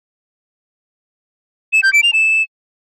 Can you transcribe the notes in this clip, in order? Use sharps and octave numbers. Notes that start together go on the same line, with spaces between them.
E7
G6
D7
F7
E7